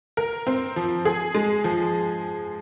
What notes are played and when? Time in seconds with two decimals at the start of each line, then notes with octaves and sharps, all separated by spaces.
0.17 A#4
0.47 C4
0.76 F3
1.05 G#4
1.35 G#3
1.64 F3